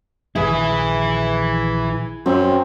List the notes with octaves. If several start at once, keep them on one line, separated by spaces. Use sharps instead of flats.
A#1 D#3 F#3 E4 G#4 B4
F#2 C4